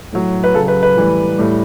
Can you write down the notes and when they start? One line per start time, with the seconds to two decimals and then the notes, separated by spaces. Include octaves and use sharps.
0.13 A2 F#3
0.44 B4
0.54 C#3 F#3 A4
0.68 B4
0.83 B4
0.96 A2 E3 G3
1.38 A2 G3